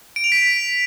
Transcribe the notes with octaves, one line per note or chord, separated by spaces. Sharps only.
D7
F7
B6